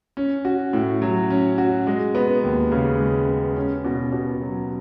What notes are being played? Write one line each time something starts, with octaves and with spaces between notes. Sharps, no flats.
C#4
F#4
A2
F#3
C#4
F#4
G#3
B3
D#2
C#3
G#3
B3
C#4
B2
B2
F#3